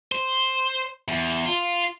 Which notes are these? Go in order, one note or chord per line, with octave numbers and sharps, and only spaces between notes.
C5
E2
F4